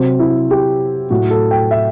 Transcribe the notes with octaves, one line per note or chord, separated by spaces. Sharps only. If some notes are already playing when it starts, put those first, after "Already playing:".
Already playing: C3 F#3 C4
E4
G4
A2 F#3 F#4
A4
G5
E5